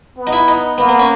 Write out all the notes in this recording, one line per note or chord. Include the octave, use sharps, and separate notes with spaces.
B3
D#4
E4
D#4
A#3 B3
B3
C#4